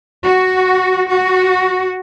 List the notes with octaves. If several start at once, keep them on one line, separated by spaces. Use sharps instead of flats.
F#4
F#4